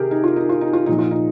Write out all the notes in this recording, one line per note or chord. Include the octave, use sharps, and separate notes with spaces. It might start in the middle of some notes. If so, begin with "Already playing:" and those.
Already playing: C3 D#3 G4 G#4 A#4
D#4
F4
D#4
F4
D#4
F4
A#2 F3 D#4
F4
D#4